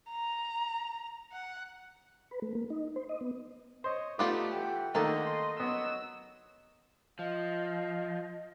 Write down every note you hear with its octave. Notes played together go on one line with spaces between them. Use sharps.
A#5
F#5
B4
A3
A#3
D#4
C5
D#5
B3
C5 C#5 D#5
A3 B3 D#4 F4 G4 D5 D6
E3 F#5 G5
D3 D#3 A3 A#3 D#4 D#5 A5
C6
F#3 B3 D#5 E6
F3 D#5 F5